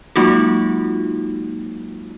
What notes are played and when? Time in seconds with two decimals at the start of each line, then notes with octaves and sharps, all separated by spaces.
0.16 F#3 G#3 A#3 D#4 F4 F#4